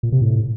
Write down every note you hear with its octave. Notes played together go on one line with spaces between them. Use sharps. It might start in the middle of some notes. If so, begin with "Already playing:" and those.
A#2
C3
A2